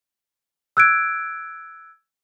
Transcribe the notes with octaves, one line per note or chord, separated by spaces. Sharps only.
E6 F#6 G#6 D7